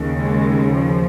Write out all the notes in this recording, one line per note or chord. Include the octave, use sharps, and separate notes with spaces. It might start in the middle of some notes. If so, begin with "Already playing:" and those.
Already playing: D#2 C#3
G#3
F3